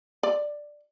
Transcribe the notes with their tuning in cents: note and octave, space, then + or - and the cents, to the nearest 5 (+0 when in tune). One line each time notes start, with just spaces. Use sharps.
D5 +5